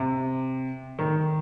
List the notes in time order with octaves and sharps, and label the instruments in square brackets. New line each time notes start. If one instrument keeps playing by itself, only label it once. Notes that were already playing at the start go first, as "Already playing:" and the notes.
Already playing: [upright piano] C3
D#3